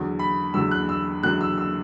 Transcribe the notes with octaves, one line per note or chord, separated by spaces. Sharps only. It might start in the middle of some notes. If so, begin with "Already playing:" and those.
Already playing: E2 D3 F#3
B5
E2 D3 F#3 E6
F#6
E6
E2 D3 F#3 F#6
E6
E6